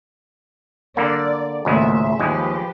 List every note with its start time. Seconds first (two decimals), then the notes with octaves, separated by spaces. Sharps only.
0.97 D3 A#3 D5
1.65 G#1 C#2 A2 G#3 A#3 E5
2.19 D#2 F3 G#3 G4 B4